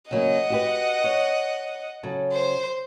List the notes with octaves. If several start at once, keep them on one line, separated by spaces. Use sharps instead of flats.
C#3 F#3 A#3 D#5 F#5
F#4 G4 B4
C#5
C#3 F#3 A4
C5